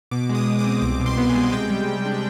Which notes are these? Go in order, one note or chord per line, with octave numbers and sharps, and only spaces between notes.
B2 D6
G#3
D#6
B2
D6
C4
C2 D6
B2
C6
B3
G#5
G#3
C3 G5
G3
C3
D4